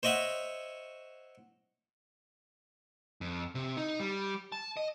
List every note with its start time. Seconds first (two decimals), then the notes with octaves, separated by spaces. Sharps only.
0.03 C5 C#5 D#5 E5 F#5
3.21 F2
3.55 C3
3.77 D#4
4.00 G3
4.52 A5
4.77 D#5